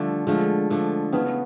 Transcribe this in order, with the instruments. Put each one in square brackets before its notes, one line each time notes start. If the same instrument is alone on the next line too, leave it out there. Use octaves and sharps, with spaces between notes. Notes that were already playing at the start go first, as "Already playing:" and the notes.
Already playing: [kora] D3 F3 A3 [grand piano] G3
[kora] D3 F3 A3 [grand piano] G#3
[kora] D3 F3 A3
[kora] C#3 E3 A3 [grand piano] B3